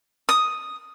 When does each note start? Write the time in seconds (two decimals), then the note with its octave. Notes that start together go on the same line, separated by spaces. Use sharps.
0.29 D#6